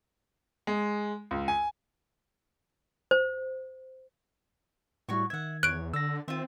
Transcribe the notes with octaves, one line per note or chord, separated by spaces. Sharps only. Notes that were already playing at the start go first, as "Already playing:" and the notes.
G#3
C#2
G#5
C5
A2 G3 E4 F#4 C#5 C#6
D#3 E5 F#5 G#6
E2 C#5 F#6 D7
D3 D5 E6 A#6
D#3 C4 F4 E5